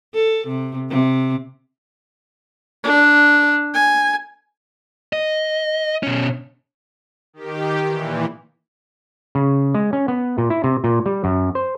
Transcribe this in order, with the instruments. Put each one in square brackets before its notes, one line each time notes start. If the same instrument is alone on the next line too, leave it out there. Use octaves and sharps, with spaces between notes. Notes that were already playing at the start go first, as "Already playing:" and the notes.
[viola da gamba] A4
C3
C3
[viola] D4
G#5
[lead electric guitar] D#5
B2 C#4
[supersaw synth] D#3 G4
A#2 E3
[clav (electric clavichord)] C#3
G#3
C#4
B3
A#2
E4
C3
A#2
G3
F#2
C5